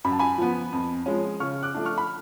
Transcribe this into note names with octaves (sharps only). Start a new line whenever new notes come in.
F#2 B5
A5
G#5 B5
F3 B3
F2
F3 G#3 C#4
C#3 C#6 F6
D6 F#6
F3 A3 D4
C#6 F6
B5